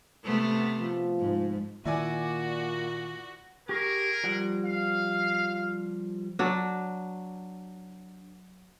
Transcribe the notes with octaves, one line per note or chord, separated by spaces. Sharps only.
C3 A3 B3
F3
G#2
A#2 D#3 A#3 E4 F#4 D5 G#5
G4 G#4 A#4 C#6
F3 G3 F#5
F5
F#3 D4